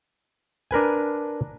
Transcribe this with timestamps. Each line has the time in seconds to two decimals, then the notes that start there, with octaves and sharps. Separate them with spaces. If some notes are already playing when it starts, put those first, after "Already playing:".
0.71 D4 A#4 B4 G#5